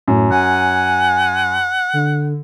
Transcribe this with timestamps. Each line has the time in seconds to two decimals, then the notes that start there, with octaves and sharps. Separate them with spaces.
0.08 F#2 A2
0.31 F#5 G#5
1.93 D3